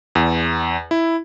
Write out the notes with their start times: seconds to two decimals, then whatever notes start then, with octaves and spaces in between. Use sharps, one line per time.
0.15 E2
0.91 E4